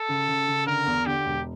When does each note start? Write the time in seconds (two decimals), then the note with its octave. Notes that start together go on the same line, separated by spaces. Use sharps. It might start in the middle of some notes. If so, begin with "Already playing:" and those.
Already playing: A4
0.08 C#3
0.27 C#3
0.48 C#3
0.66 D3 A#4
0.86 E2
1.06 D3 G4
1.25 E1